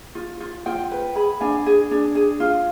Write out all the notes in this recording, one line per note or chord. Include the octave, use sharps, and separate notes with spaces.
F4
F4
F4 G5
B4
G#4 B5
D4 G#5
G#4
D4
G#4
F4